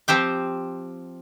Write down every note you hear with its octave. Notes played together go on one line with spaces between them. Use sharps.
F3 C4 G4 G5